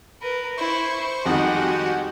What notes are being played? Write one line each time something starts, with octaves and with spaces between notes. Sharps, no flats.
A#4 B4
E4 C5 C#6
F2 D#3 G3 G#3 F#4 G4 F#5